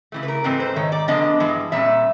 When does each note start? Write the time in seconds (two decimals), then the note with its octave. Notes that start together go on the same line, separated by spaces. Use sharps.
0.12 C#3 E3 A3
0.23 B4
0.28 A#4
0.44 G#2 E3 A3 C4 B4
0.60 C5
0.76 G#2 D#3 C#5
0.92 D5
1.08 D3 F3 G#3 B3 D4 D#5
1.40 G2 E3 G#3
1.72 A#2 G3 C#4 E5